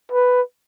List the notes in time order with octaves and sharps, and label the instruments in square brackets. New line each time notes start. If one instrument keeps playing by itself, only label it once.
[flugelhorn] B4